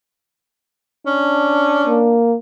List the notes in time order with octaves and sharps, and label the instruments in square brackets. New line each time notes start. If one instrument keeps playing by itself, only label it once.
[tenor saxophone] C#4 [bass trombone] D4
[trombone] A#3